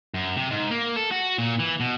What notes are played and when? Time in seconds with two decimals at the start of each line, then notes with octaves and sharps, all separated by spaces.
0.14 F#2
0.36 C3
0.51 G#2
0.71 A#3
0.96 A4
1.12 F#4
1.38 A#2
1.59 E3
1.80 B2